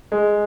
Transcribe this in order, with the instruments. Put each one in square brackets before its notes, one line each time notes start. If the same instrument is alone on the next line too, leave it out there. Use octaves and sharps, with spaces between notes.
[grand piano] G#3